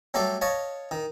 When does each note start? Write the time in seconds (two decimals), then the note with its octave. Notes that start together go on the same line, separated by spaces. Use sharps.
0.14 F#3 G3 A3 A4 D5
0.41 C#5 D#5 F5 A5
0.91 D#3